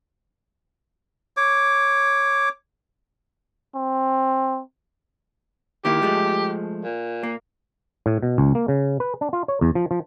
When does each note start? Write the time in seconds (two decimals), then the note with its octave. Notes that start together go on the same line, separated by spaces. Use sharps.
1.37 C#5 D6
3.75 C4
5.85 D#3 A#3 E4 G4
6.02 F3 G#3 A3
6.84 A#2
7.23 A#3
8.06 A2
8.23 B2
8.38 C#2
8.55 A#3
8.68 C#3
9.00 B4
9.21 D4
9.33 F4
9.48 C#5
9.61 E2
9.75 F3
9.91 F3